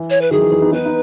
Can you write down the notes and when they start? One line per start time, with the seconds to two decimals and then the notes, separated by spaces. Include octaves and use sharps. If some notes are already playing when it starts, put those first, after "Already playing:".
Already playing: E3
0.10 C#5
0.21 B4
0.31 D#3 F#3 G#4
0.41 E3
0.52 E3
0.62 B3 D#4
0.72 B3 D#4 B4
0.86 D#4